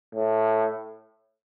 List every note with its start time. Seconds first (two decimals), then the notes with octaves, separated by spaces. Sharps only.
0.15 A2